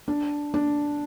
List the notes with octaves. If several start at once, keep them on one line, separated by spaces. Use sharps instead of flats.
D4
D4